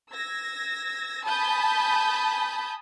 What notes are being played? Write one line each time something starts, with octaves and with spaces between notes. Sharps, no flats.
E6 G#6 A#6
G#5 A5 B5 D#6 G6